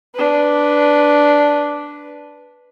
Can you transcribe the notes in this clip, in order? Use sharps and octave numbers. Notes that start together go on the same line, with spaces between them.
D4 B4